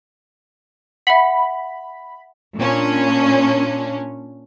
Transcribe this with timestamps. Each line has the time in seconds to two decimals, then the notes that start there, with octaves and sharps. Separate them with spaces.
1.07 E5 F#5 B5
2.58 A#2 C#4 D4